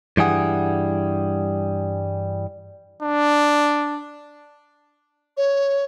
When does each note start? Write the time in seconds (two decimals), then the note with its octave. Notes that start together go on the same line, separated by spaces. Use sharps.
0.17 G2 E3 G3 G#4 F#5
3.03 D4
5.37 C#5